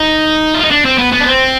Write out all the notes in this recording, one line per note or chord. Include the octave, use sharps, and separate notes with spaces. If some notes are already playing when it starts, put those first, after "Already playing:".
Already playing: D#4
F4
D#4
D4
C4
B3
B3
D4
C4